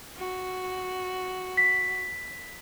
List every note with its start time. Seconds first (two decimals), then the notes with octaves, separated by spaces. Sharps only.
0.16 F#4
1.57 B6